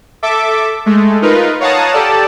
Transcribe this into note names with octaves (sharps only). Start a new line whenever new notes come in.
A4 E5 D6
G#3 A3
D#4 F4 A#4 B4
C#5 F5 F#5 A5 A#5 D#6
G4 A4 D5 A5